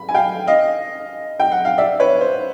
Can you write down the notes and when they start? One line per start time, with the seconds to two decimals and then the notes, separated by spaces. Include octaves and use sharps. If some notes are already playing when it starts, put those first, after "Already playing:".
Already playing: B5
0.09 G#5
0.14 F5 G5
0.47 D#5 F5
1.40 G5
1.52 F#5
1.65 F5
1.78 D5 E5
2.00 B4 C#5
2.21 C5